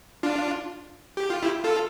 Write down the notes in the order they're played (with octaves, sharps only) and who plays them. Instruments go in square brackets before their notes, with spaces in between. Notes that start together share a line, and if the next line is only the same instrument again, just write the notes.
[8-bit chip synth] D4 F4
G4
F4
E4 G4
F4 A4